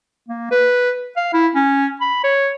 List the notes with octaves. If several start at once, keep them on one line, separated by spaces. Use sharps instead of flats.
A#3
B4
F5
E4
C#4
B5
C#5